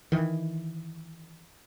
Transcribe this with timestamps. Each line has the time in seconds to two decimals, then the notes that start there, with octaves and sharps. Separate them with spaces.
0.12 D#3 E3